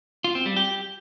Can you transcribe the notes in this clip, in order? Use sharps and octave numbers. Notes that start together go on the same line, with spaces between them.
F4
C4
G3
G4